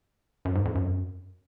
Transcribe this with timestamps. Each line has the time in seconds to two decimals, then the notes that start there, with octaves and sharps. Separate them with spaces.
0.45 F#2
0.55 G#2
0.65 F2
0.75 F#2